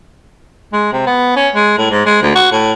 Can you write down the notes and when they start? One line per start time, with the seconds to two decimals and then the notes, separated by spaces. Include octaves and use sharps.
0.73 G#3
0.93 C3
1.07 B3
1.36 C#4
1.55 G#3
1.78 A2
1.90 G#2
2.06 G#3
2.22 D2
2.35 F#4
2.52 A2